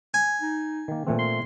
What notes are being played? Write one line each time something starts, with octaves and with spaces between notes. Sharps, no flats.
G#5
D#4
D#3 A#3
A#2 E3 A3 C4
C6